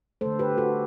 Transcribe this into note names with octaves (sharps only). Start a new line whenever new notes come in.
D3 A3 A4 C5
G4 B4
F#4 A4